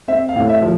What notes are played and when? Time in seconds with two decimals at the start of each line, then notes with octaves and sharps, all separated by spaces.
0.08 C4 E5
0.29 F5
0.36 A2
0.49 E5
0.62 F3